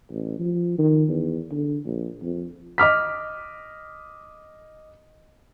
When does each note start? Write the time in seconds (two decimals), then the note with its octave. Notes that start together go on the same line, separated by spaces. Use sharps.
0.10 A1
0.39 F3
0.78 D#3
1.09 E2
1.51 D3
1.85 A#1
2.22 F2
2.78 D#5 D6 F6 B6